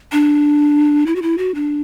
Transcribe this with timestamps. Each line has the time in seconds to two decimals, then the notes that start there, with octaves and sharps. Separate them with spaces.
0.12 D4
1.07 E4
1.16 F#4
1.22 E4
1.38 F#4
1.55 D4